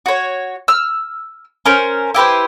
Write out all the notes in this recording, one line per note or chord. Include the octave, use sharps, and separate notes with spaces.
F#4 C#5
E6 F6
C#4 A#4 C5
E4 G4 B4 C5